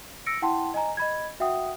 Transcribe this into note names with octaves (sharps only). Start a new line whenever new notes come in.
E6 A#6 C#7 D7
E4 F#5 G5 A5 C6
D#5 G#5 A#5
D#5 B5 G#6
F#4 E5 F#5 G5 D#6